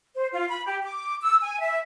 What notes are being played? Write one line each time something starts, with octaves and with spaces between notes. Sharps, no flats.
C5
F4
B5
G4
D6
E6
G#5
E5